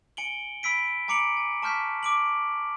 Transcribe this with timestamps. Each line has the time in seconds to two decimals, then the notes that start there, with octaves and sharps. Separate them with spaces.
0.17 G#5 C#7 D7 F#7 G7
0.63 B5 E6 B6 D7
1.08 G#5 A#5 D6 C#7 D7 F#7
1.37 G#5
1.63 A5 C#6 F6 G6 B6
2.03 D6 D7 F#7